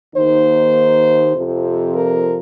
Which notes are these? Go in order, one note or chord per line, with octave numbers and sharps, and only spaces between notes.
D#2 D#3 A#3 D#4 C5
F2 C3 F3
A#4